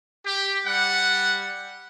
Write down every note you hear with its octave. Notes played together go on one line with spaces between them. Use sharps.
G4
G3 F#5